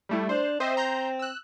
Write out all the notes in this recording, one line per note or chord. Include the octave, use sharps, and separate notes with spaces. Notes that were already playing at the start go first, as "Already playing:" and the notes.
G3 A3 E4
D4 C5
C4 C5 D#5 E5
A#5 C6 G6
E6 F#6